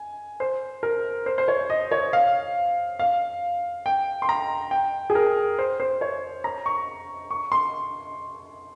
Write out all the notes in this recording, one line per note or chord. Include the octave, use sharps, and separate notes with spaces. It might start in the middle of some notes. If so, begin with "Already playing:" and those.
Already playing: G#5
C5
A#4
C5
C5
C#5
D#5
C#5
F5
F5
G5
C6
A#5
G5
G#4
A#4
C5
C5
C#5
A#5
C#6
C#6
C6